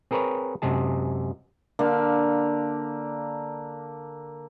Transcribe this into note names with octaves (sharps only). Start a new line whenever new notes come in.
C4 G#4 A#4 B4 C#5
F#2 C3 G#3 G#4 A5
D3 A#3 F5